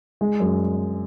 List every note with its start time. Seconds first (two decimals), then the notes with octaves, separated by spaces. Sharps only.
0.21 G#3
0.40 F#2